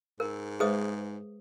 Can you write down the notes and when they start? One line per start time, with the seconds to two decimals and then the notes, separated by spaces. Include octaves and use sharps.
0.20 G#2 A#4
0.60 G#3 G#4 B4 C5 E5 D#6